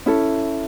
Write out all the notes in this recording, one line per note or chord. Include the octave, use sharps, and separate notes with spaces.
C#4 E4 A4